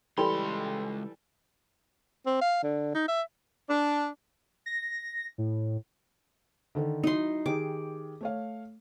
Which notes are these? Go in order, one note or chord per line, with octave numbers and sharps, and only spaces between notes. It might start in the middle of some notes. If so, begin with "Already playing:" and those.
C#2 E3 G3 A4 G5 B5 C6
C4
F5
D3
D#4
E5
D4
A#6
A2
D3 D#3 A4
F#3 D#4 E4 C6
D#3 G4 G#4 D6
A3 C#5 F5